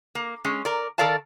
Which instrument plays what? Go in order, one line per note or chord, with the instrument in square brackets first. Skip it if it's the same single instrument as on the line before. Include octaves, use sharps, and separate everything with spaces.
[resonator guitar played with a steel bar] A#3
G#3 C#4
A#4 D5
D#3 A4 A#4 D5 F5 A5